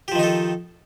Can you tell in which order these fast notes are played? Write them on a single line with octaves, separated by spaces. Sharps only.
G4 F3 D#3 D#4 A4